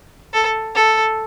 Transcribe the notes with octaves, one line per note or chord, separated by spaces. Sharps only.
A4
A4